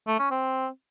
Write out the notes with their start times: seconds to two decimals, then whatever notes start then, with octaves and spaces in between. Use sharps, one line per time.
0.07 A3
0.19 C#4
0.31 C4